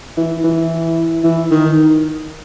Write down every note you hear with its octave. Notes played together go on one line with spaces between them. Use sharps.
E3
E3
E3
D#3